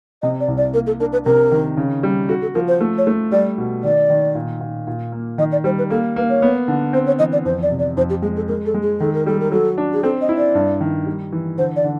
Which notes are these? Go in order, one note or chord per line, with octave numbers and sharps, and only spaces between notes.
C3 D#5
D5
C2
D5
A#3 A#4
A4
D4 A#4
B4
C3 A#4
D#3
C#3
G3
F#4 A4
A4
F3 A#4
C5
A3
C#5
A3
G3 D5
B2
D#3 D5
D#3
A#2
A#2
A#2
A#3
D#3 D#5
D5
G3 C5
B4
A#3 A4
A#3 B4
C#5
B3
D3
C4 C5
C#5
E3 D#5
D5
F2 C5
D5
C3
D5
F2 C5
G4
G#3 G#4
A4
G#3 A#4
A4
G#3
G#4
D#3 A4
A#4
G3 A4
A#4
F#3 A4
D4
G#4
C4 A4
D#5
E4
D5
G2
D#3
G3
E3
D3 C5
D5
D3